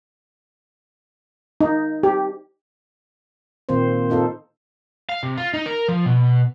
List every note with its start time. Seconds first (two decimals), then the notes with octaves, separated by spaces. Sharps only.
1.61 D#4
2.03 G4
3.69 A#2 D#3 A#3 C4 C5
4.10 C4 D#4 F4 A4
5.09 F5
5.23 C3
5.37 F4
5.54 D#4
5.66 A#4
5.88 F3
6.06 B2